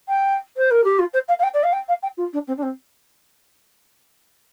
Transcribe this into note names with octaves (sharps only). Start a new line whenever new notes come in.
G5
C5
A#4
G4
F4
C5
F5
F5
G5
D5
F5
G5
F5
G5
F4
D4
C4
D4
C4